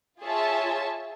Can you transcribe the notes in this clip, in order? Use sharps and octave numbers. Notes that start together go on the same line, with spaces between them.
F4 G#4 C#5 E5 A5